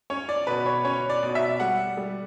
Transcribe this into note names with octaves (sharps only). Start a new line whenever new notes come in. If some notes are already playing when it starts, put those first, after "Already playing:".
C#4 C#5
D5
B2 B4
C#5
C#4 C#5
D5
B2
E5
G3 F#5
G3